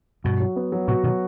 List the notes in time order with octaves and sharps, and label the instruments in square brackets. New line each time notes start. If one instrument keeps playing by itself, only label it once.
[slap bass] G2 B2 [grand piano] F#4
[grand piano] F#3
B3
F#3
[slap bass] A2 C3 [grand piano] F#4
[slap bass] B2 D#3 [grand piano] F#3